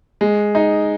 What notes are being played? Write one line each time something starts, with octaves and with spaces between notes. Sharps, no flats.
G#3
D#4